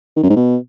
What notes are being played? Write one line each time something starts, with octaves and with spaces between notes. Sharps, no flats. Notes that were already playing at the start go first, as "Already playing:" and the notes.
D#3
F#2
G#2
B2